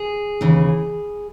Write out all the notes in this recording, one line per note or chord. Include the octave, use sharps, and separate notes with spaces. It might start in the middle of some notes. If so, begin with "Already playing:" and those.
Already playing: G#4
D#2 C#3 E3